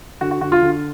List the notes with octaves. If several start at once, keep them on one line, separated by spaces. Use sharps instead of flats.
D3 F#4
F#4
D3 F#4
F4
D3